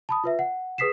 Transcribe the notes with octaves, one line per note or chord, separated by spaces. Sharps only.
A5 B5 D#6
F4 B4 E5
F#5
G#4 B4 D#6 B6 C7 E7